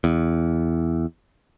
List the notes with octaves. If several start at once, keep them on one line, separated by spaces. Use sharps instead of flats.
E2